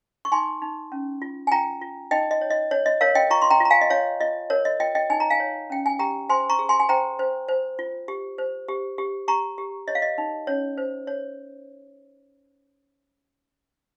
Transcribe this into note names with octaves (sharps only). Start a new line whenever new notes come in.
C#6
D#4 G#5 C6
D#4
C#4
F4
G#5
F4 G5 A#5
F4
D#4 D#5 G5
D#5
C#5
D#5
C#5
D#5
A#4 C#5 F5
D#5 G5
F4 A#5 C#6
C6
G5 A#5
F4
A#5
F5 G#5
D#5
F4 C#5 F5
F4 D#5
A#4 C#5
D#5
F4 D#5 G5
D#5 G5
D#4 G#5
A#5
F5 G#5
C#5
C#4 G5
G#5
G4 G5 A#5
C5 G#5 C6
A#5 C#6
G#4
G#5 C6
G#5
C5 G5 A#5
C5
C5
F4
G4
C5
G4
G4
G4 A#5 C#6
G4
C#5 D#5
F5
D#5
D#4
C#4 C#5
C5
C#5